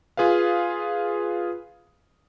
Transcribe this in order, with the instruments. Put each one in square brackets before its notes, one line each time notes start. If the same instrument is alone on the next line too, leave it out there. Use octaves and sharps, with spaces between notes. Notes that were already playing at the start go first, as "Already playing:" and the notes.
[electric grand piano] F4 G#4 B4 F5